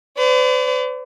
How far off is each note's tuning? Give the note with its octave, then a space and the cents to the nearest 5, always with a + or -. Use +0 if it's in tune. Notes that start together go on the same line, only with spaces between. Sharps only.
B4 +45 D5 -35